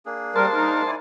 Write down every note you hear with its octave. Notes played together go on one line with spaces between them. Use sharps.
A#3 D4 G#4
G3 A#4 C5 A5
D#4 A#4
E4 D5 G#5